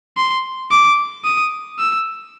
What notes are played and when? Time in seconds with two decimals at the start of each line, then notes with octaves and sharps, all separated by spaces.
0.17 C6
0.71 D6
1.24 D#6
1.79 E6